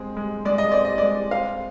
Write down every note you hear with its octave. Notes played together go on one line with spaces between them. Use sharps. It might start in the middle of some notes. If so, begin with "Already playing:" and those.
Already playing: G#3 C4
G#3
G#3 D5
D#5
C4 D5
D#5
G#3 D5
C4 F5